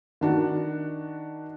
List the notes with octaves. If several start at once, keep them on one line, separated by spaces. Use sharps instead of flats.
D#3 D4 F#4